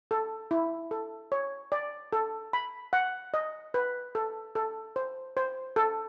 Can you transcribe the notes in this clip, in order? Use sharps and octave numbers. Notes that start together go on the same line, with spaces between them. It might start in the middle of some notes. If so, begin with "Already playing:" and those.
A4
E4
A4
C#5
D5
A4
B5
F#5
D#5
B4
A4
A4
C5
C5
A4